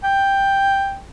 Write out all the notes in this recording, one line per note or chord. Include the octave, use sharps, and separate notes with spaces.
G5